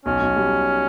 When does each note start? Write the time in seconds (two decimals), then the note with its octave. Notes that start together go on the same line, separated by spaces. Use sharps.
0.05 B1 C#4
0.21 B1
0.36 G3